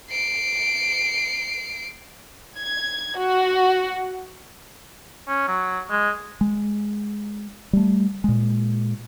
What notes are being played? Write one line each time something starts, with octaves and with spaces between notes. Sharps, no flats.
C7 D7
G#6
F#4
C#4
F#3
G#3
G#3
G3 A3
A#2 G#3